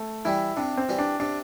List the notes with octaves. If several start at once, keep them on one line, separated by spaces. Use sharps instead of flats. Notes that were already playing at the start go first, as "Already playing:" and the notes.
Already playing: A3
E3 G3 E4
C3 D4
C4
E3 G3
D4
C3 D4